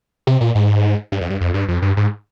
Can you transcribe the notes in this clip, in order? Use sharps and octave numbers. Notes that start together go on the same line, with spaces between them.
C3
A#2
G#2
G2
F2
G2
F2
G2
F2
G2
G#2